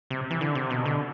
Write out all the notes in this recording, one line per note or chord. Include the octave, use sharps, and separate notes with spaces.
C3
E3
D3
C3
B2
D3